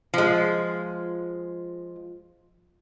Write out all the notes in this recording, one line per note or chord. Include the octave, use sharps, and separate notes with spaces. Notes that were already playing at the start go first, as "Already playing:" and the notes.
F3 G#3